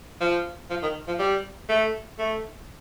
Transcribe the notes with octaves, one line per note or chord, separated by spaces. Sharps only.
F3
F3
D#3
F3
G3
A3
A3